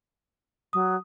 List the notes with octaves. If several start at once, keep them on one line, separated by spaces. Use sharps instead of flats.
F#3 D#6